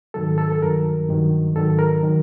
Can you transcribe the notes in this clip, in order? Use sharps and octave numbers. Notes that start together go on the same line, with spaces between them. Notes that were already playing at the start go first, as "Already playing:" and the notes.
G#2 D#3 F#3 A4
A4
A4
G2 D#3 F#3 A#4
G2 D#3 F#3
G#2 D#3 F#3 A4
A#4
D#3 F#3